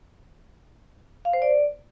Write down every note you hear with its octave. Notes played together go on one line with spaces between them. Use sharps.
F5
C5
D5